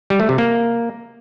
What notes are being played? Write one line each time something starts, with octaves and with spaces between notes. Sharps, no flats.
G3
A3
C3
A#3